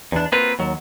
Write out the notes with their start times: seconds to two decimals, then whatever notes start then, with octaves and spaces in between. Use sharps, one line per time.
0.12 E2 D4
0.32 A#3 C4 F4 F#4 B4
0.59 D#2 F#3